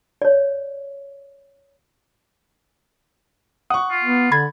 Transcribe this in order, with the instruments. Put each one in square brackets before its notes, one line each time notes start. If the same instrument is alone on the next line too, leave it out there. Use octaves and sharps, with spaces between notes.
[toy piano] C#5 D5
[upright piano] F#5 C#6 [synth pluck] D#6
[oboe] F4
[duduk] B3
[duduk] D3 [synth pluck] B5 G#6 A6